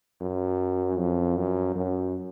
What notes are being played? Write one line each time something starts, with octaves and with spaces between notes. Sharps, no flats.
F#2
F2
F#2
F#2